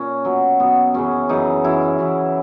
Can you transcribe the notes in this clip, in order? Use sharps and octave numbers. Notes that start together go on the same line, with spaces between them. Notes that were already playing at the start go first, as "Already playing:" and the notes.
Already playing: A#2 C#4
B2 F#3
B2 F#3 B3
F#2 C#3 E3 C#4
F#2 C#3 E3 D#4
F#2 E3 E4
F#2 E3